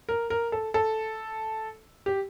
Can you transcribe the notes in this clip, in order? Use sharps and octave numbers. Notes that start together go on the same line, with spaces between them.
A#4
A#4
A4
A4
G4